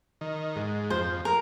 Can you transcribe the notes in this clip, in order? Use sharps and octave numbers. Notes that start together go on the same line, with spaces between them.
D#3
G#2
F2 C5
A#4